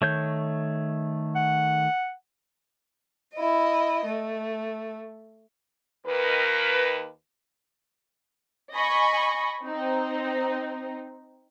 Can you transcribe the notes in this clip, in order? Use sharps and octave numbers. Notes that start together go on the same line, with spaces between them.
D#3 A3 C#5 G6
F#5
E4 D#5
A3
D#2 D#3 A#4 B4
D#5 G#5 B5 C#6
C4 D#4